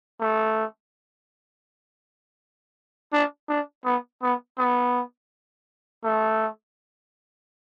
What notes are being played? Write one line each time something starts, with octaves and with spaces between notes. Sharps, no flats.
A3
D4
D4
B3
B3
B3
A3